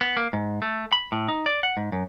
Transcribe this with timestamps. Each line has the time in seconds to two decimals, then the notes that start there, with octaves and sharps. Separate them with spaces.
0.01 B3
0.17 A#3
0.33 G#2
0.62 A3
0.92 B5
1.12 A2
1.28 D#4
1.46 D5
1.63 F#5
1.77 G#2
1.92 F#2